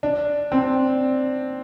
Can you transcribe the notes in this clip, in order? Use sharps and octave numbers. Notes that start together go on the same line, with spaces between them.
D4
C4